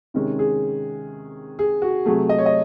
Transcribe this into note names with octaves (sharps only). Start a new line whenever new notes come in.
C3 D#3 G#3 C#4
G#4
G#4
F#4
C3 F#3 A3 G#4
D#5
C#5
D#5